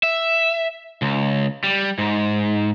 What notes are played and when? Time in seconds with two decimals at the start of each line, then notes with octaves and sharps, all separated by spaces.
0.03 E5
1.02 C#2
1.64 G3
1.98 G#2